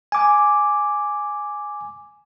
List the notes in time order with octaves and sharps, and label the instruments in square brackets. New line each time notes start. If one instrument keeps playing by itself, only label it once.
[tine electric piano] G#5 D6